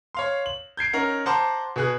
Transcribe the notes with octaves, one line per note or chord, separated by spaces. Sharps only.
C#5 F5 C6
F#7
G6 G#6 C7 D7
C#4 D#4 A#4 F#5
C5 F#5 A5 A#5 C6 D6
B2 G#4 F#6